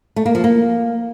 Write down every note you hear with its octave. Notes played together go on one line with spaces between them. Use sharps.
A3
A#3
F3
A#3